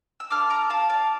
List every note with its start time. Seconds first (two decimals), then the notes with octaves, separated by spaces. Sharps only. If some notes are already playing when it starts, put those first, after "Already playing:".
0.20 E6
0.30 D4 F4 A4 D6 F6
0.50 A#5 D6
0.70 F5 A5
0.89 D5 F5